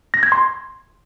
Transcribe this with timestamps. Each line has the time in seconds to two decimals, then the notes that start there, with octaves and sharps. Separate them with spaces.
0.14 A#6
0.23 G#6
0.32 C6